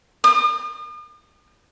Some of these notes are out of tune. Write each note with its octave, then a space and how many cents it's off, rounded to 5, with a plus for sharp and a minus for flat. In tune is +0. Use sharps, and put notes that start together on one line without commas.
D#6 -45